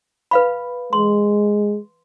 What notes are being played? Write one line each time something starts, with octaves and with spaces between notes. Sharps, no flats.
B4 F5 B5
G#3 C6